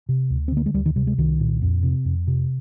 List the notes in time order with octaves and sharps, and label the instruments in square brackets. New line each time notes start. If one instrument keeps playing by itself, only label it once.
[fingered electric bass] C3
D2
C4
D3 A#3
G#3
D2 G3
D#3
C3 G3
G#3
C2 D#3
A#2
F2
C3
F2
C3